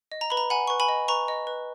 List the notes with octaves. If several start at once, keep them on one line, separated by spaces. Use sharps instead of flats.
D#5
A#5
B4 B5
A#5
F#5 G#5 B5
B4 C#6
G#5 B5
D#5
B4 A#5 C#6
D#5
B4